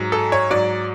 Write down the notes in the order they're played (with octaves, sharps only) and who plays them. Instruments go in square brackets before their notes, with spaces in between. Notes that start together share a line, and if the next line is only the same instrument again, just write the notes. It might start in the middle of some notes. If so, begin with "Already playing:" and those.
Already playing: [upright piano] G#2 F#3
A4
C#5
G#2 F#3 D5